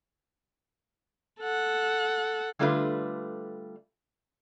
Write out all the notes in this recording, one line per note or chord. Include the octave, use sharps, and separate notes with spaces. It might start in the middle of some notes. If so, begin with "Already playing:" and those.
A4 F#5
D3 G3 A3 D4 F4 B4